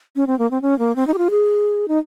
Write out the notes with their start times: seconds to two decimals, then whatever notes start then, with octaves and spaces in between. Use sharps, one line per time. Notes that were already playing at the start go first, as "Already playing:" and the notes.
0.16 C#4
0.27 C4
0.39 A#3
0.51 C4
0.62 C#4
0.79 A#3
0.96 C4
1.07 D#4
1.14 G4
1.18 F4
1.30 G#4
1.88 D#4